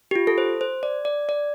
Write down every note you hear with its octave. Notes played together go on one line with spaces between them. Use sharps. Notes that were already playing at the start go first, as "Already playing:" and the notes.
G4
F4
A4
C5
C5
D5
D5
D5